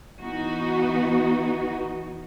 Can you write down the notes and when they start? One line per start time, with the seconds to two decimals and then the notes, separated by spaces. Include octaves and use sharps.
0.20 E3 B3 D#4 F#4